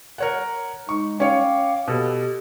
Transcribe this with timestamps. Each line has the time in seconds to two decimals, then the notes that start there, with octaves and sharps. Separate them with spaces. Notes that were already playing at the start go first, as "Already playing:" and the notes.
0.18 A#4 C#5 F#5
0.89 G#3 D#4 C#6
1.20 C#4 C#5 F5 G5 D6
1.88 B2 G4 A4